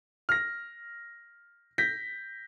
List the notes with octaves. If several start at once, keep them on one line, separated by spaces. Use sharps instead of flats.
F6 A#6
G6 A#6 B6